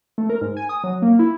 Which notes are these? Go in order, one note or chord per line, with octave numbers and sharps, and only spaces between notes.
A3
A#4
G#2
G#5
D#6
F#3
A#3
E4